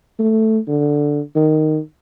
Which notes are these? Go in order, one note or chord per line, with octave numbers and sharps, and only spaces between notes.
A3
D3
D#3